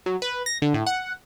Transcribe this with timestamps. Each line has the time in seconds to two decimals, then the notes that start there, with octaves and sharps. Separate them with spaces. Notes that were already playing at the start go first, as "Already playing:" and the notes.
0.06 F#3
0.22 B4
0.46 A#6
0.62 D3
0.74 A2
0.86 F#5